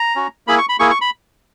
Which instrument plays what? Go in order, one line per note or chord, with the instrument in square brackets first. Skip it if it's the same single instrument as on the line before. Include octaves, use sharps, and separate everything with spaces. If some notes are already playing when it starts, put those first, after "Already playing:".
Already playing: [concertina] A#5
C#4 F#4
A#3 E4 G#4 B5
C#6
B5
A#3 E4 G#4 C#6
C#6
B5